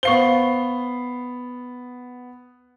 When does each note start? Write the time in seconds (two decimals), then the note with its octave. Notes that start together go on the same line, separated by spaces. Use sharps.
0.03 B3 C5 F5 C#6 C7 G7